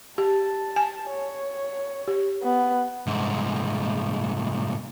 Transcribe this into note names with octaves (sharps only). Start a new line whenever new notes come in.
G4 A5
G#5
C#5
G4
B3
C2 G#2